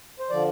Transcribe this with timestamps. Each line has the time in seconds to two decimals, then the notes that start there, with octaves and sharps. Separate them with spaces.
0.19 C5
0.30 D3 F3 D5